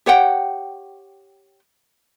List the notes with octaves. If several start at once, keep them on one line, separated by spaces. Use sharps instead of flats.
G4 C#5 F#5 G5